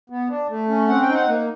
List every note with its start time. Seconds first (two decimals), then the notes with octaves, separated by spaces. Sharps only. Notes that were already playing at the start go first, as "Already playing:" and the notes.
0.10 B3
0.29 D4
0.49 A3
0.69 C#4
0.88 C4 F#5
1.02 G5
1.08 D#4
1.14 F#5
1.28 A#3